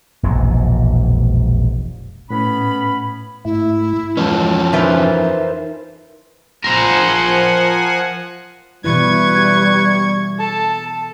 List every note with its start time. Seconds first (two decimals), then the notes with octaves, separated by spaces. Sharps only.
0.23 E1 A#1 F2 G#2
2.30 A2 B3 C#4 B5
3.45 G#2 A3 E4
4.17 F2 E3 F3 G#3 C#4
4.73 E3 D#4 F4 A#4 C5 E5
6.64 F3 A#4 C5 F#5 G#5
8.84 B2 E3 G3 E4 B4 C#6 G#6
10.39 A4 A5